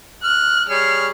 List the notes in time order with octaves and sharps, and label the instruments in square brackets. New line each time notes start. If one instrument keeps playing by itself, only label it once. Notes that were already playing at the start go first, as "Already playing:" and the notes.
[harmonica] F6 [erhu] F#6
[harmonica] G3 G#4 C#5 [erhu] F6